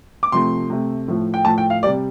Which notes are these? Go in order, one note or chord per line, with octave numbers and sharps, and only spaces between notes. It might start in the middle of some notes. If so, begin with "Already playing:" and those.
D6
C3 F3 A3 C6
C3 A3
A2 F3 A3
G5
A2 F3 A3 A5
G5
F5
C3 G3 D5